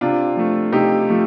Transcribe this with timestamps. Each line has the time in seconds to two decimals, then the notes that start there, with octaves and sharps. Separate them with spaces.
0.01 C3 D4 F4
0.37 F3 A3
0.72 C3 D#4 G4
1.09 F3 A3